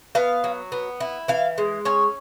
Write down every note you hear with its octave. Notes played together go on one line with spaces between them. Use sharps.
B3 F5
F#3
B3
E4
E3 F5
G#3
C#4 C#5